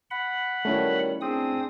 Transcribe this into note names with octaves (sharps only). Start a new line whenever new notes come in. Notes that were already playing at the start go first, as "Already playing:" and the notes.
F#5 B5
D#3 F#3 G3 A3 C#4 E4
C4 D4 G#4 D#6